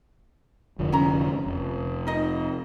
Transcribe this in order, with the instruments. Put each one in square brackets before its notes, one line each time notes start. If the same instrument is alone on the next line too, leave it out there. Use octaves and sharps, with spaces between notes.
[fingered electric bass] F1 D3 F3
[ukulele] C#4 A#5
[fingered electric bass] F1
[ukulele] D#4 D#5